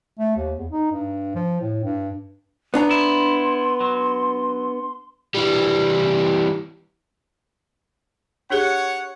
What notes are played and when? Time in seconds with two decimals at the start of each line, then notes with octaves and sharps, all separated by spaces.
0.19 A3
0.36 D#2
0.58 E2
0.71 D#4
0.92 G2
1.35 F3
1.61 A2
1.84 G2
2.74 B3 D4 A#5
2.91 E4 C6
3.80 F#3
5.34 E3 G3
8.50 D4 G4 G#4 C#5 F#5